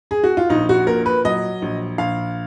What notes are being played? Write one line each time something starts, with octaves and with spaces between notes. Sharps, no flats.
G#4
F#4
F4
A#1 D#4
F#4
A#2 A#4
B4
F#3 D#5
A#1
A#1 F5